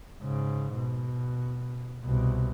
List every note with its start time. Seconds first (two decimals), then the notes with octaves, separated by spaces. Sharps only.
0.23 G#2 C#3
0.75 B2
2.04 C2 B2